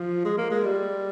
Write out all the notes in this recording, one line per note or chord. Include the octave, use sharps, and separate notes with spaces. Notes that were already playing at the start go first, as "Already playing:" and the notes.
Already playing: F3
G#3
A#3
G#3
G3